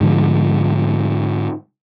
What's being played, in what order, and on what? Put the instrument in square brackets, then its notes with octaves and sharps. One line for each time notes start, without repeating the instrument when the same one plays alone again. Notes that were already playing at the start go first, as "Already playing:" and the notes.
[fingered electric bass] G#2 D3 F3